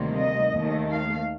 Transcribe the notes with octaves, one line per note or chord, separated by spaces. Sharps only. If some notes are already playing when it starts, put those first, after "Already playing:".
Already playing: D2 C3 D#3 G3 A#3
D#5
D#2 D#3 A3
F5